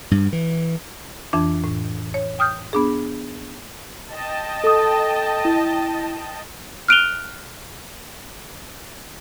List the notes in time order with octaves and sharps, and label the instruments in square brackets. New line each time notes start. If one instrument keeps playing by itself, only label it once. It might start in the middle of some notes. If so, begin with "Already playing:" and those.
[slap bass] G2
E3
[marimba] F2 E3 D4
A2
C#5
G5 D#6 F6 G6
B3 D4 G#4
[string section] D#5 G5 A5
[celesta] A4 D#6
E4
[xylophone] F6 F#6 D7 D#7 F7 G7